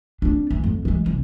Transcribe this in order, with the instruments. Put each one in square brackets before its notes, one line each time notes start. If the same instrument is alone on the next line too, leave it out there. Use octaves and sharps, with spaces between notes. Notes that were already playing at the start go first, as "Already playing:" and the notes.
[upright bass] C4 D4
E3
F2
E3 G#3
C2